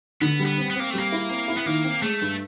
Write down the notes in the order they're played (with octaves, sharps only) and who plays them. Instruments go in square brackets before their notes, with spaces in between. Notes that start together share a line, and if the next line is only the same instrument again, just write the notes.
[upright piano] D3 [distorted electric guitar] B3
[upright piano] G3
[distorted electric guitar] B3
[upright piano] C4
[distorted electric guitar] B3
[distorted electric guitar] A#3 [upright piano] C4
[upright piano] G3 [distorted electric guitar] A3
[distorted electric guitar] A#3
[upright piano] E4
C4
E4
[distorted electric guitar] B3
[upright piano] D#3 [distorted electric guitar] A#3
[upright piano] C4
[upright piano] G#3 [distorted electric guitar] A3
[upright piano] G2